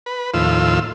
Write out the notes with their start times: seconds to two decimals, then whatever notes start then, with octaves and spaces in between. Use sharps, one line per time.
0.06 B4
0.34 D#2 A2 F3 F4 E6